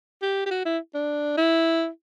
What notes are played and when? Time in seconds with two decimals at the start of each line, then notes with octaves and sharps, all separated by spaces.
0.22 G4
0.46 G4
0.51 F#4
0.65 E4
0.94 D4
1.37 E4